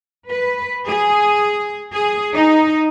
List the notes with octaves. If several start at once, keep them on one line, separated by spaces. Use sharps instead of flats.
B4
G#4
G#4
D#4